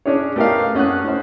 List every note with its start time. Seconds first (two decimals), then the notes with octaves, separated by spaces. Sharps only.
0.06 C#4 D4 G#4 C#5
0.36 A3 B3 G4 A#4 D#5 F5
0.75 A3 C#4 F#5 D#6 F#6
1.05 C#4 C5